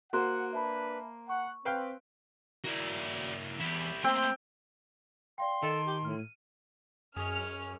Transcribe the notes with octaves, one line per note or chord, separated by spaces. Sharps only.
A#3 F#4 C5 F#5 C6 F#6
D4 B4 E5 A5 B5
F#5 C#6
C4 B4 F5 G5
A#3 E4 F#4 D5
E2 E4 G4
A3 A#3 C4 G5 C6
D5 F5 G5 C6
D#3 A4 D#5 A5
G4
A2 F6
D#7
F#2 C#4 G#4 D#5 F6